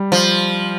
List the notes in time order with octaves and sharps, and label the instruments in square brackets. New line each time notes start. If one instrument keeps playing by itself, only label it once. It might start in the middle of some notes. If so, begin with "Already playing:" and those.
Already playing: [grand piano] G3
[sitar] F3